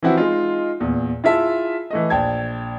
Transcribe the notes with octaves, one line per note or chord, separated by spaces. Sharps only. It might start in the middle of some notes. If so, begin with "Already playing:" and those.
E3 F3 C4 E4 F#4
G#3 D#4 F4
E2 A#2
E4 F4 G#4 E5 A5
E3 A3 D#5
A#1 G5 A5 G#6